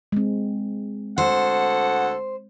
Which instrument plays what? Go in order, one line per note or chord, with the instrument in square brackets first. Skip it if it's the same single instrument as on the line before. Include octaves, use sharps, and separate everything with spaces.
[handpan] G#3 C4
[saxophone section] D2 A4 F#5 [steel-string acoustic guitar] C5